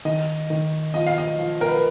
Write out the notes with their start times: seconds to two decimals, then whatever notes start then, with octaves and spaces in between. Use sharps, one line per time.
0.05 D#3 D#5
0.50 D#3
0.94 F3 D#5
1.07 F5
1.18 D#5
1.39 F3
1.61 A#4
1.68 B4